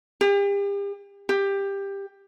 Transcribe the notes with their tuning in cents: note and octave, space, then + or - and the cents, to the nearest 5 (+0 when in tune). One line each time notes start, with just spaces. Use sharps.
G4 +40
G4 +15